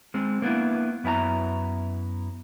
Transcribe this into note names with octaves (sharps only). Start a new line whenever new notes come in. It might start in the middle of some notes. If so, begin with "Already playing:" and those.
G#3 C4
A#3 B3 D4 E4
F#2 B3 E4 G#5 A#5